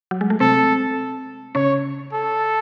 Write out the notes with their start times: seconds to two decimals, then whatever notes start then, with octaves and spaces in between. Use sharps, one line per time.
0.11 F#3
0.21 G#3
0.30 A3
0.40 C3 C4 A4
1.55 C#3 C#4 C#5
2.13 A4